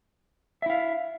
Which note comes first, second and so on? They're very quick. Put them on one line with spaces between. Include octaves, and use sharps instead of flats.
E5 E4 F5